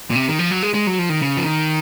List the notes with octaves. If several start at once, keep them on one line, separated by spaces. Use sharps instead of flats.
A#2
C3
D#3
F3
F#3
G#3
G#3
F#3
F3
D#3
C#3
F3
D#3